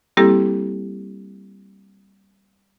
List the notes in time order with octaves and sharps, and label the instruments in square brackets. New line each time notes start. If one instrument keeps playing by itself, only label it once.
[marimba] G3 A#3 C4 E4 G4 A4